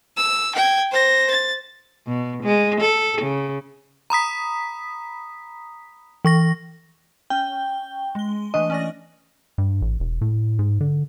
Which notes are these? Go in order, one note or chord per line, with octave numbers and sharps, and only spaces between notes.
E6
G5 G#6
C5 A#6
A6
B2
G#3
A4
C#3
A#5 B5 D#6 B6
E3 C#6 A#6
C#4 G5
G#3 G7
E3 A3 D4 D#5
C#4 D5 A#6
G2
A1
E1
A2
G#2
D3